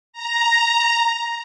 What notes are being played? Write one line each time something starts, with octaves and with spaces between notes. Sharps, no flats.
A#5